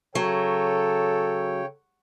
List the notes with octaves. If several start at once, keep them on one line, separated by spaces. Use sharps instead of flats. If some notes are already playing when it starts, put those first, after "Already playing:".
C#3 F#3 A4 C#5 G5